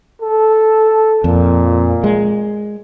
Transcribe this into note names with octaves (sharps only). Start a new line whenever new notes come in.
A4
F2 A#2
G#3